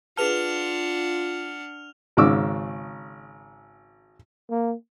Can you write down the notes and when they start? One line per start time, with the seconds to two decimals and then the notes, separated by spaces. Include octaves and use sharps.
0.17 D4 F4 G#4 B4 F#5 A5 F6 F7
2.17 G#1 G#2 C#3 D6 E6
4.50 A#3